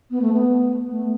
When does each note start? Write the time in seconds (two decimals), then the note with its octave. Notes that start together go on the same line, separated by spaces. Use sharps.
0.11 B3
0.22 A3
0.33 B3
0.89 A3